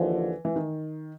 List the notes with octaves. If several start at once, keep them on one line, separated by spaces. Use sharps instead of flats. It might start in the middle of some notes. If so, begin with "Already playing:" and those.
Already playing: D#2 D3 E3 F3
E3
D#3